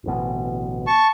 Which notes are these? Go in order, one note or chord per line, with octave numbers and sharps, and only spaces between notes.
D1 A1 B2
A5 C#6